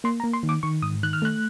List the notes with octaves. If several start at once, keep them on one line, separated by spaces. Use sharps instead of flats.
A#3 C6
A#5
A#3
C6
D#3
D6
D#3 C#6
G#2 D#6
D#3 F#6
F6
A3 F#6